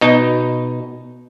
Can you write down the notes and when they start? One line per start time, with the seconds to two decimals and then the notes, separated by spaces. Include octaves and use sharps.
0.01 B2 D#4